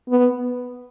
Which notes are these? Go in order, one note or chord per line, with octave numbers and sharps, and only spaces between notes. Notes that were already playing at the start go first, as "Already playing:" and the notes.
B3